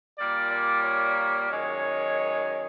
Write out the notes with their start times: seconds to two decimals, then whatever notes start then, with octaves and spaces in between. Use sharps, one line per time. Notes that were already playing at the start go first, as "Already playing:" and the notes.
0.19 A#2 G3 A#3 D5
0.51 D5
0.83 C#5
1.49 F#2 D#3 G#3 C#5